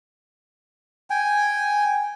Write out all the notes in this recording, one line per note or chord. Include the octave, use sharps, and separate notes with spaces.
G5 G#5